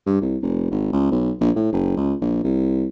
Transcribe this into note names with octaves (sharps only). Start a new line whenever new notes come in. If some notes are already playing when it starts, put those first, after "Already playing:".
G2
C2
F1
G#1
C#2
B1
A#1
A2
F#1
C#2
A#1
C2